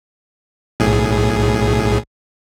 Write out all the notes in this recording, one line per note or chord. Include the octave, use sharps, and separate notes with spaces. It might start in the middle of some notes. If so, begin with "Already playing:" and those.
B1 A2 G#4